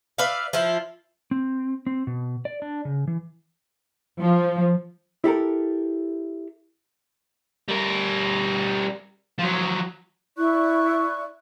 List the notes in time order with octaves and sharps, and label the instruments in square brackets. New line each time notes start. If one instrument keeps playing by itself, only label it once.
[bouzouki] B4 D5 E5 F5
F3 E4 F4
[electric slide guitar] C4
C4
B2
D5
D4
C#3
E3
[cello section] F3
[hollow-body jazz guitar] E4 G4 A4 A#4
[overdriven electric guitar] G3 A#4
F3 F#3
[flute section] E4 D5 C#6 F#6